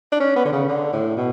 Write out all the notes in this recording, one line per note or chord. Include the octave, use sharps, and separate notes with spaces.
D4
C#4
B3
D3
C#3
D3
A2
B2